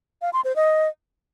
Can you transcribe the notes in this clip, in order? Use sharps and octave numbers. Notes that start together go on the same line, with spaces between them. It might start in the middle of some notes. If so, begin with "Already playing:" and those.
F5
C6
C5
D#5